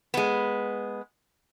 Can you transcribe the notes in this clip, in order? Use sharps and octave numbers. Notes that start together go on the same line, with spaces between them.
G#3 B3